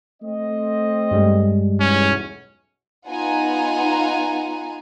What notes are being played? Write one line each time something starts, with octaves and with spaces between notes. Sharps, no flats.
A3 C4 D#5
G2 G3 G#3
B1 E2 C#4
B3 D#4 F4 F#5 G#5 A#5